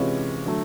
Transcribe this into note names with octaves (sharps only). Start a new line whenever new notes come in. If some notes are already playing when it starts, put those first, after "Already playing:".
Already playing: C3 E3 G#3 C#4 F4
D3 F#3 A3